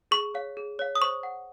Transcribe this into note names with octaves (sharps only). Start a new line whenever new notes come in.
G#4 C#6
C#5 F5
G#4
C#5 F5
D#6
C5 C#6
F#5